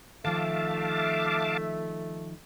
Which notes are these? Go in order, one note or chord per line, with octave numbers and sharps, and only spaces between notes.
D#3 F3 A3 E5 F5 A5 D6